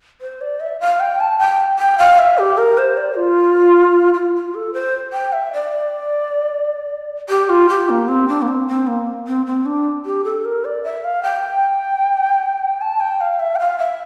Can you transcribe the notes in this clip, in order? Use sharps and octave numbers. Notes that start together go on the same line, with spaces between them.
C5
D5
E5
F5
G5
A5
G5
G5
F5
E5
G4
A#4
C5
D5
F4
F4
F4
A4
C5
G5
E5
D5
G4
F4
G4
A#3
C4
D4
A#3
C4
C4
A#3
C4
C4
D4
G4
A4
A#4
D5
E5
F5
G5
A5
G5
F5
E5
G5
F5
E5